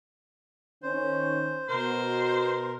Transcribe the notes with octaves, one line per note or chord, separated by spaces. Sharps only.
D#3 C#4 C5
B2 A#4 C5